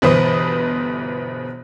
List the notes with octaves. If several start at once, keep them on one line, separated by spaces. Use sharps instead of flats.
G1 B2 E3 B4 C5 D#6